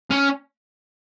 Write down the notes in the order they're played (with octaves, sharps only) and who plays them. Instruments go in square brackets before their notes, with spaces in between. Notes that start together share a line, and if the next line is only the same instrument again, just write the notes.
[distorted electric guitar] C#4